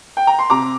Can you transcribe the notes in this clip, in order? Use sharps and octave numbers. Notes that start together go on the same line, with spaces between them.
G5
A#5
C6
C3 A#5 D6